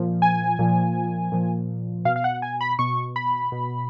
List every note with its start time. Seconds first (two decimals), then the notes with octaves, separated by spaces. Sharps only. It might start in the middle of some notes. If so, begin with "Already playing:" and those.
Already playing: A#2 F3
0.22 G#5
0.59 A#2 F3
1.32 A#2 F3
2.05 B2 F5
2.16 F5
2.24 F#5
2.42 G#5
2.61 B5
2.79 B2 C#6
3.16 B5
3.52 B2